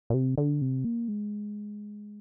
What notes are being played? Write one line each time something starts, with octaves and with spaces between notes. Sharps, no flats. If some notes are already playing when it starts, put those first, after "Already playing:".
A#2
C3
D3
C3
A#3
G#3